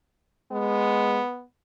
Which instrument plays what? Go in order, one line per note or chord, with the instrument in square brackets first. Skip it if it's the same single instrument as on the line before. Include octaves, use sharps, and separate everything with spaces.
[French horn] G#3 [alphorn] B3